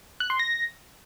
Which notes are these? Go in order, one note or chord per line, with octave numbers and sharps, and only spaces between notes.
F#6
C6
A#6